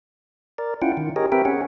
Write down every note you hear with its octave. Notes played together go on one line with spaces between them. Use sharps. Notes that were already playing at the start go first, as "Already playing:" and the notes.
A#4 D5
C#4 E4 F4 F#5 G5
D#3
G4 G#4 A#4 C#5 D#5
C4 G4 A#4 B4 E5 G5
C#4 G#4 C#5 F#5